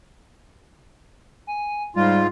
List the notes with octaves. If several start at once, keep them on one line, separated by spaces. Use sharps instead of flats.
G#5
G#2 G3 F4